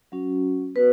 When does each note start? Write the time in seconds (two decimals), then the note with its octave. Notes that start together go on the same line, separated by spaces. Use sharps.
0.12 F#3 C#4 F#4
0.75 B3 F#4 B4